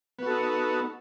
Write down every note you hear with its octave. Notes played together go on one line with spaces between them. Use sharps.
B3 D#4 F#4 A4